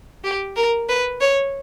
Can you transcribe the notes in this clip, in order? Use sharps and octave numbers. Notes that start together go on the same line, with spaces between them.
G4
A#4
B4
C#5